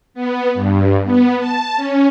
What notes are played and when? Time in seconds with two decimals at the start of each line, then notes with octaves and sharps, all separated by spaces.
0.14 B3
0.54 G2
1.04 B3
1.39 A5
1.76 C#4